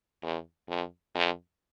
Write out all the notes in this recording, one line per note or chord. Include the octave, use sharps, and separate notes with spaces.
E2
F2
F2